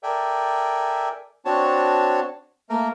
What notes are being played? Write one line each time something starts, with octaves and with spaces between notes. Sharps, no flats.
A4 A#4 D5 E5 G5 G#5
C4 D4 F#4 C#5 A5
A3 A#3 A#4